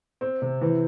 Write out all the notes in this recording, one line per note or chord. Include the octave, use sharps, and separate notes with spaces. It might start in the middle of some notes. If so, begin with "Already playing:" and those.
C4
C3
E3